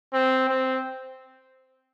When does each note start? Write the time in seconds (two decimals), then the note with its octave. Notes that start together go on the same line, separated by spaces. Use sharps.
0.13 C4
0.48 C4